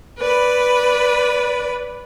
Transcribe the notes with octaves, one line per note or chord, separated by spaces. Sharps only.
B4 D5 B5